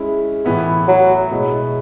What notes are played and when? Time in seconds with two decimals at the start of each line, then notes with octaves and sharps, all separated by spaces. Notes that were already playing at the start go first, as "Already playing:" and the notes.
Already playing: G#3 C#4 E4
0.45 A2 E3 B3 E4
0.88 F#3
1.31 B2 G#3 B3 E4